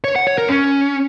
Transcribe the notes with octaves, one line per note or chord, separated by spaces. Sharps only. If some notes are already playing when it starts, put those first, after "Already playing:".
C#5
F#5
C#5
A#4
C#4